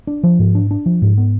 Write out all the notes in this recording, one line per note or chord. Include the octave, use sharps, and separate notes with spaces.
D4
F3
G#2
D4
D4
F3
G#2
B3